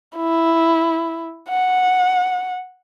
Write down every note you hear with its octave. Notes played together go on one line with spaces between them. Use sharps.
E4
F#5